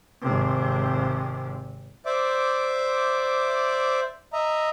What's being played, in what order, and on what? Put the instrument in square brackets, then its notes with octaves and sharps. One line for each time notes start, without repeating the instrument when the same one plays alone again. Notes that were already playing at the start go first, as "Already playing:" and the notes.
[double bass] G#1 C3
[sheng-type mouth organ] C5 D5 E5 D6
D#5 E5 A#5